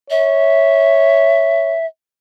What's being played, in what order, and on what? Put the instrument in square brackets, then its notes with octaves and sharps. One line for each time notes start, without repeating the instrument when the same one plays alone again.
[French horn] C#5 [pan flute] E5